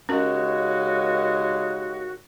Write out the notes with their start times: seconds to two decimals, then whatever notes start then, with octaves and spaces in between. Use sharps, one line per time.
0.09 D#2 C#3 G#3 C#4 F#4 A#4